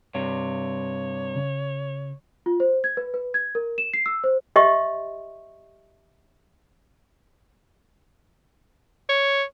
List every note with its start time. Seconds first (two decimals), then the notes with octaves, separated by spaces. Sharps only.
0.15 G2 C3 C#5
1.36 C#3
2.46 F4
2.60 C5
2.84 G#6
2.97 B4
3.14 B4
3.34 G#6
3.55 A#4
3.78 E7
3.94 C7
4.06 E6
4.24 C5
4.56 G4 D#5 E5 C6 C#6
9.09 C#5